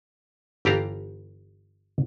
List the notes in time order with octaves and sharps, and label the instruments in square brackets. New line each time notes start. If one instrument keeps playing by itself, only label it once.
[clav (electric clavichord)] G1 E3 G4 A4 F5 A#5